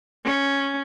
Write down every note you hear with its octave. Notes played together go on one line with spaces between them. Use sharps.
C#4